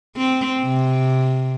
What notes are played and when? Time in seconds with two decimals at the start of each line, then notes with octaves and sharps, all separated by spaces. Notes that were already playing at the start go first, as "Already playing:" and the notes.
0.17 C4
0.62 C3